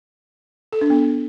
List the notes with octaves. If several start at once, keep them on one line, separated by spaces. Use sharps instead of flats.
A4
D4
B3